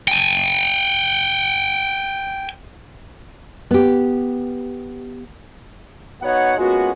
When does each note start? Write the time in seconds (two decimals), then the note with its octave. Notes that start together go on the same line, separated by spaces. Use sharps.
0.08 G5 G#5
3.71 B3 G4
6.22 B3 D#4 F#4 C#5 F#5
6.58 G#3 A#3 B3 C#4 F4 F#4